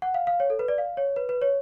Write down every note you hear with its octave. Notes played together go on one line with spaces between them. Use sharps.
F#5
F5
F5
C#5
A4
B4
D5
F5
C#5
B4
B4
C#5